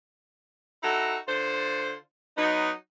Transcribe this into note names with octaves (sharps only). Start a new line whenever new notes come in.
D#4 E4 F#4 A4
D3 F4 C5
F#3 B3 D#4